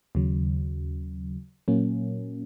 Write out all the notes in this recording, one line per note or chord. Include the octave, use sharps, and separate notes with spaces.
D#2 C#3 F#3
A#2 F#3 A#3 C#4